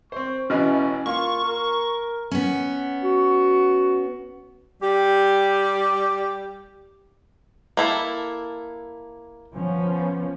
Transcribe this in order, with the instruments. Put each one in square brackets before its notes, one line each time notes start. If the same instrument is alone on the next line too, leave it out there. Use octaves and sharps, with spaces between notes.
[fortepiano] C4 C5 [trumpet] C#6
[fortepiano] A1 B2 E3 [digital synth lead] C#4
[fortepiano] A#3 [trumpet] F4 [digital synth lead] C#6
[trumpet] A#4
[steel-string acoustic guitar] B3 C#4
[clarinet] F#4
[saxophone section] G3 G4
[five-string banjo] A#3 E4 A4
[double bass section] F3 B3 C#4